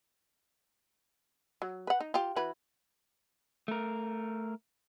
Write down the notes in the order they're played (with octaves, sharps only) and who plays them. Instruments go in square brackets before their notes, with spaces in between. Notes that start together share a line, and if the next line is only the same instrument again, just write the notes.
[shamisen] F#3
B4 F#5
D#4
F4 G4
E3 F#4 B4
[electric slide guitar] A3 A#4